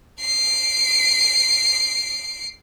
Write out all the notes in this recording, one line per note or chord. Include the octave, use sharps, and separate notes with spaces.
C7 D7